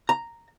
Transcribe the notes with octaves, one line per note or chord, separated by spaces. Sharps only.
A#5